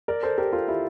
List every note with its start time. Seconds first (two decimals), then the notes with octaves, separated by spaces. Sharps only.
0.08 A#4 D5
0.23 A4 C5
0.38 G4 A#4
0.53 F4 A4
0.68 E4 G4